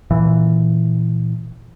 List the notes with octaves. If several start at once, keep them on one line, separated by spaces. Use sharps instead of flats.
A#2 E3